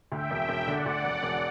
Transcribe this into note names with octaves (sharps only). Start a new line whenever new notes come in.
D2 E5 G5
E1
E1
D3 D5 F#5
D2
E1
E1